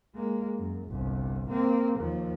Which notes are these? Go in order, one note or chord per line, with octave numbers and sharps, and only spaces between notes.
G#3 A#3
F#2
G1 C2
A#3 C4
D#2 F3